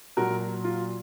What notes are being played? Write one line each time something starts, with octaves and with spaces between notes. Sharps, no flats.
A#2 F#3 F#4 A#4
F4